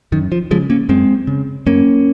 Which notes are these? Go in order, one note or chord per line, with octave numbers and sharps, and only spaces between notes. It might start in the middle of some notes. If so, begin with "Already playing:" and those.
F#2 D#3
F3
C#3 F3 G#3
A#3 C#4
F#2 G#3 C4
C#3
F#2 A#3 C#4